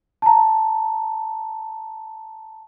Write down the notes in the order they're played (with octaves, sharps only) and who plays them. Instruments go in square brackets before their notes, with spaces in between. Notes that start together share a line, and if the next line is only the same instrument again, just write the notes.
[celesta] A5 A#5